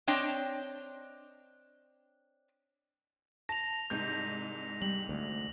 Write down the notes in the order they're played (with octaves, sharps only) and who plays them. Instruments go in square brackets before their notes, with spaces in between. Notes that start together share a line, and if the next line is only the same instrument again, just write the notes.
[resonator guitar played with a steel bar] C4 D4 C#5 D#5 G5 A5
[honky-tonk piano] A5 [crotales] A#6 F7
[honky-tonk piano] C2 G#2 G6
[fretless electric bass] G3 [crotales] F#7
[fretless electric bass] D2